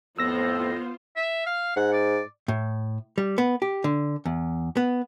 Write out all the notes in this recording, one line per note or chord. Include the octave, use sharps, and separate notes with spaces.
F2 A2 B3 F4 C5 E6 A#6
E5
F5
G#2 F#5
D5
A2
G3
B3
G4
D3
E2
B3